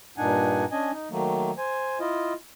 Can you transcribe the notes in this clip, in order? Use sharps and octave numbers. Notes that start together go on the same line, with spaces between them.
G2 A#2 D4 D#4 F#5 G#5
C#4 D4 D#5 G#5
D#4
D#3 F#3 A3 A#3
C5 G#5
E4 F4 D#5